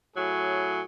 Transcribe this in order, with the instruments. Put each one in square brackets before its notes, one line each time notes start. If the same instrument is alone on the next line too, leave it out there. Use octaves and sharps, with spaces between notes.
[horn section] A2 F#3 G#4